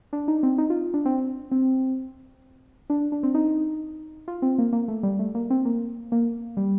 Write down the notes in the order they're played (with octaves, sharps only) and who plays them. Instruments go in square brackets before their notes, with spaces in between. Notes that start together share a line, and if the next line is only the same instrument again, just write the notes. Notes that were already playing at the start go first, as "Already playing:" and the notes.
[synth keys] D4
D#4
C4
D#4
F4
D4
C4
C4
D4
D4
C4
D#4
F4
C4
A#3
A#3
A3
G3
A3
A#3
C4
A#3
A#3
G3